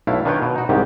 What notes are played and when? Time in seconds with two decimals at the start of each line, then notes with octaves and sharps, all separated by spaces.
0.07 B1 A3 E4 F5
0.25 D#3 D4 F4 B4 C#5 G5
0.42 B2
0.56 D#4 F#4
0.69 C2 G#2 D#3 G4